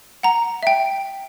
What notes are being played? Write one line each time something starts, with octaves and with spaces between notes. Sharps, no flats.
F#5 A#5
E5 G5